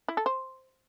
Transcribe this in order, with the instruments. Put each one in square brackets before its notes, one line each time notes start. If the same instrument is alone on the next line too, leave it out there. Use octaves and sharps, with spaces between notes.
[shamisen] E4
A4
C5